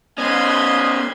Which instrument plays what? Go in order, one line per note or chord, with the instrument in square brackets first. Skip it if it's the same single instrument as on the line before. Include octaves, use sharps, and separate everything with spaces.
[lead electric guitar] B3 C#4 [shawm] D#5 [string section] B5 C6 G#6